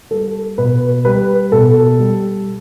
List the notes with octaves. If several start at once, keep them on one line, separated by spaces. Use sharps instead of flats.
G3 A4
B2 B4
G3 B4
B2 A4
G3